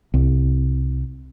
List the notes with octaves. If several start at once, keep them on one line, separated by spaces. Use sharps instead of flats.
C2